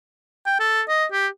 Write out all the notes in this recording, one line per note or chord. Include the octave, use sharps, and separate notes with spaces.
G5
A4
D#5
G4